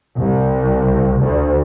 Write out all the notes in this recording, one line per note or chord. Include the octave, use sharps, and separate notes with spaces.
C2
D2